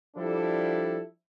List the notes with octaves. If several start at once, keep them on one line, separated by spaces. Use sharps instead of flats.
F3 G3 D4 E4 A4